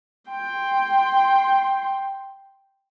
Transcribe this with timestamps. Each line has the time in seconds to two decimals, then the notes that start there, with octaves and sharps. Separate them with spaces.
0.30 G5 C6